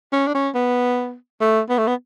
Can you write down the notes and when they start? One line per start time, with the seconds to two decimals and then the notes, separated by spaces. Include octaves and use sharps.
0.13 C#4
0.28 D4
0.35 C#4
0.55 B3
1.41 A3
1.69 B3
1.78 A3
1.87 B3